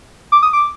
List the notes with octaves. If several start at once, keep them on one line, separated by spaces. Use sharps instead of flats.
D6
D#6
D6